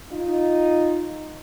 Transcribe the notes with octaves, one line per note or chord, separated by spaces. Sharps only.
D#4 F4